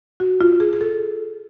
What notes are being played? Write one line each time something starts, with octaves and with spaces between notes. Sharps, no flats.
F#4
F4
G#4
G#4
A4